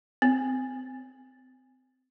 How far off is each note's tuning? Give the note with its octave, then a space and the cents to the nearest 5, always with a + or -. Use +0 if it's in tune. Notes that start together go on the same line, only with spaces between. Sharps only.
C4 -30